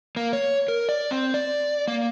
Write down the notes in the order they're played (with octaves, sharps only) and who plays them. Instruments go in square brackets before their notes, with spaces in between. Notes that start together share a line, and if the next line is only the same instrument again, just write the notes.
[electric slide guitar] A#3
C#5
A#4
D5
C4
D5
A#3